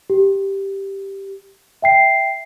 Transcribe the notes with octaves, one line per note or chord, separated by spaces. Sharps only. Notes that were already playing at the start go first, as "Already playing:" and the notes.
G4
E5 G5 C7